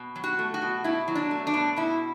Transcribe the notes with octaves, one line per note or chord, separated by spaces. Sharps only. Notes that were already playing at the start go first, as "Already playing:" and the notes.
Already playing: B2
F#3
F#4
A3
F#4
B2
B2 E4
F#3
D4
A3
D4
B2
B2 E4